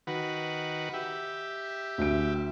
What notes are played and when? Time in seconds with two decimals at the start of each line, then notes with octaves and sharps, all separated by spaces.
0.07 D#3 F#4 B4
0.94 G4 E5
1.98 D2 D7